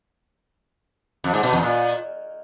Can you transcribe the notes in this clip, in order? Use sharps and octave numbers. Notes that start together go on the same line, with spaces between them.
F2
G#2
B2
E2
A#2